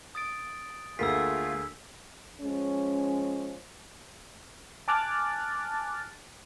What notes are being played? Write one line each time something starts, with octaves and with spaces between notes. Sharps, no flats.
D#6 A6 D7
D2 A3 A#3 F4 G#4 E6 B6
F3 G#3 C#4
G#5 A5 D6 F6 F#6 A6